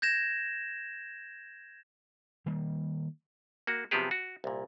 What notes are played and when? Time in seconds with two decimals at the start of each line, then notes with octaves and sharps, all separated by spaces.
0.02 G6 G#6 A#6 E7
2.46 D#3 G3 A#3
3.67 A#3 F#4
3.91 C3 F3 F#3 B3 G4 G#4
4.11 F#4
4.44 C2 A#2